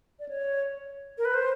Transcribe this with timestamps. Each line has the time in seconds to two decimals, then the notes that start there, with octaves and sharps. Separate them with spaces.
0.19 D5
0.28 C#5
1.18 A#4
1.25 B4
1.34 C5